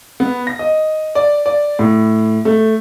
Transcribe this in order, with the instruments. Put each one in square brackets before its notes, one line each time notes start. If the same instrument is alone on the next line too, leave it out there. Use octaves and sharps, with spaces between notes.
[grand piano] B3
A#6
D#5
D5
D5
A2
A3